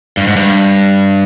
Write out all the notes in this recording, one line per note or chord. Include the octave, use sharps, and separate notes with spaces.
G2
G#2
G2